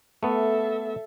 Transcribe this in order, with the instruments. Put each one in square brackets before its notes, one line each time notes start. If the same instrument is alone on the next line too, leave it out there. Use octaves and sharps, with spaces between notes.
[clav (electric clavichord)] A3 B3 [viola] A4 E5